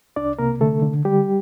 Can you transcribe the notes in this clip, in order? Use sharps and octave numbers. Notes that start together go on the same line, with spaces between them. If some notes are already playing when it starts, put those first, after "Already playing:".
C2 D4 D5
C3 A#3 A#4
D3 A3 A4
D3
D3 G3 G4